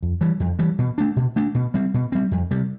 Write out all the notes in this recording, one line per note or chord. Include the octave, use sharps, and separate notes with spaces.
F2
E3 G3
F2
E3 G3
B2
A3 D4
B2
A3 D4
B2
G3 C4
B2
G3 C4
F2
C3 G3